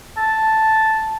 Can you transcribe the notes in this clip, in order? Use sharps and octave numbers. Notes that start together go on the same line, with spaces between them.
A5